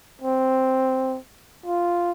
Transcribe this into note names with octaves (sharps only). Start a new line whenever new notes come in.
C4
F4